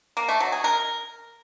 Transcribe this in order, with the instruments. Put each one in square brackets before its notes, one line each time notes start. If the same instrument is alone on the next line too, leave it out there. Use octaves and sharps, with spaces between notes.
[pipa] A#3
A3
F#3
G#4
A#4